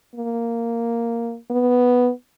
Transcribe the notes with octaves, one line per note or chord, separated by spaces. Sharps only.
A#3
B3